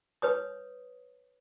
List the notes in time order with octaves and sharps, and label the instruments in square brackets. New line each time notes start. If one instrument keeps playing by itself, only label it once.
[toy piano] B4 C#5 D#6